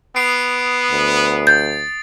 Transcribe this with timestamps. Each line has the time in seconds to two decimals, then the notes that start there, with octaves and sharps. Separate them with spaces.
0.16 B3 D#6 C7 D7
0.91 D2
1.47 G6 A6